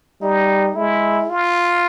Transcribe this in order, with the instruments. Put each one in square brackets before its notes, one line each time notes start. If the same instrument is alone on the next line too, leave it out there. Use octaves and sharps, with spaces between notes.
[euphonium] G3 [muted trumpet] D#4
[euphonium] G#3 [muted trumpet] E4
[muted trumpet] F4